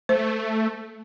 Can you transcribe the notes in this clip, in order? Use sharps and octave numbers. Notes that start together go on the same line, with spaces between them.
A3 C5